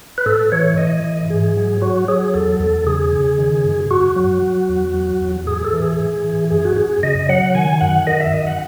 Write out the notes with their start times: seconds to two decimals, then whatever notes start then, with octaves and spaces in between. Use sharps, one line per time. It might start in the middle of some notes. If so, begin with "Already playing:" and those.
0.18 B4
0.26 A2 A4
0.52 E3 C#5
0.78 A2 D#5
1.04 E3
1.30 G#2 G#4
1.57 F#3
1.82 F#3 F#4
2.08 F#3 G#4
2.34 E2 A4
2.60 E2 A4
2.86 C#3 G#4
3.12 C#3
3.38 D#3
3.65 F#2
3.90 F#2 F#4
4.16 F#3
4.42 F#3
4.69 E2
4.94 F#3
5.21 E2
5.46 A2 G#4
5.65 A4
5.73 E3
5.82 G#4
5.99 A2
6.25 E3
6.50 F#2 G#4
6.65 F#4
6.76 F#2 G#4
7.03 C#3 D#5
7.29 F#3 F#5
7.55 D#3 G#5
7.81 F#2 F#5
8.07 D#3 D#5
8.20 E5
8.33 F#2 D#5
8.47 F#5